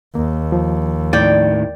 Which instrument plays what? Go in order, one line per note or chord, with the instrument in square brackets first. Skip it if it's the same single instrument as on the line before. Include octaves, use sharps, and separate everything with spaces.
[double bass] D#2 [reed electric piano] A#3
[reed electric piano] F3
[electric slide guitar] A2 D#3 [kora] D5 G5